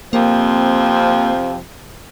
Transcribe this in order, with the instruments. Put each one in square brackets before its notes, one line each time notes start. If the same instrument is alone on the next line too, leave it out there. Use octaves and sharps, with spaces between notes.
[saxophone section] F2 C3 F3 [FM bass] A#3